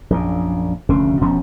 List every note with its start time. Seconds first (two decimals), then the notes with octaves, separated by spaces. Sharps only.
0.10 A#1 F#2 A#2
0.89 F1 D2 C#3 C#4
1.21 E1 B2 F3 C#4